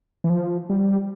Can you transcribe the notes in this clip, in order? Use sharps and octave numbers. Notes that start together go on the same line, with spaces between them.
E3
F3
G3